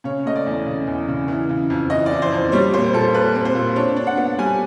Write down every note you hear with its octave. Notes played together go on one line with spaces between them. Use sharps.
C#3 C#5
A3 D#5
D5
E2
C#3
E2
C#3
E3
C#3
F2
E3 D#5
D5
E3
C5
F2
G3 C#5
A#2 C5
A#2 A4
A#2 B4
C4
C5
A#2
D4 C#5
D4
F#5
B3
G3 G#5